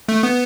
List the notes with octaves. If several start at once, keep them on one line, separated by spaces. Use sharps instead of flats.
A3
B3